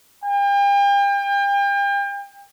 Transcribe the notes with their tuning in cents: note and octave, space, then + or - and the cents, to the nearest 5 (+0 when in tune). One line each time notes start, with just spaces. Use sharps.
G5 +40